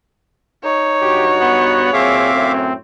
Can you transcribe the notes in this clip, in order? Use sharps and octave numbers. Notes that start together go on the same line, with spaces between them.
D#4 C#5
G2 F#4 G4
B3 F#5
A#2 F#3 C4 G#4 E5 F5 D6
F#2 A2 A3